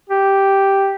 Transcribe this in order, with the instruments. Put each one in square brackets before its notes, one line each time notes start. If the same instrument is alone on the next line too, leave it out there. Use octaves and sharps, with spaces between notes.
[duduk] G4